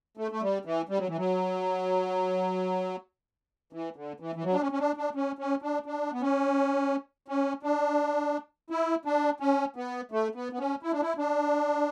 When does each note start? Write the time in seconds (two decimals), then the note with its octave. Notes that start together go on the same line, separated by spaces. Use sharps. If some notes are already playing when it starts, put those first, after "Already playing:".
0.17 A3
0.31 A3
0.42 G3
0.65 E3
0.89 G3
0.98 F#3
1.08 E3
1.17 F#3
3.73 E3
3.96 D3
4.20 E3
4.35 E3
4.44 F#3
4.53 D4
4.61 C#4
4.72 C#4
4.80 D4
4.97 D4
5.15 C#4
5.39 C#4
5.62 D4
5.86 D4
6.13 B3
6.21 C#4
7.28 C#4
7.63 D4
8.70 E4
9.05 D4
9.40 C#4
9.76 B3
10.12 A3
10.35 B3
10.53 B3
10.59 C#4
10.83 E4
10.92 D4
11.01 E4
11.18 D4